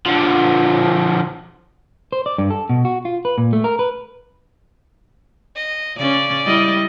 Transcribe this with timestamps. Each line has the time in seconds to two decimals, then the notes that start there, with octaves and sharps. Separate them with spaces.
0.06 D3 F3
2.12 C5
2.26 D5
2.38 G2
2.50 A4
2.69 B2
2.85 F#4
3.05 F4
3.25 B4
3.38 A#2
3.53 A3
3.64 A#4
3.79 B4
5.56 D#5
5.97 C#3 C#4 D5
6.46 G3 E4 D#5